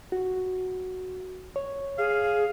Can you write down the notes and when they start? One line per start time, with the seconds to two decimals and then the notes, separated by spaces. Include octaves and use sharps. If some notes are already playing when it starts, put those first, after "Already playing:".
0.12 F#4
1.56 C#5
1.98 G#4 F5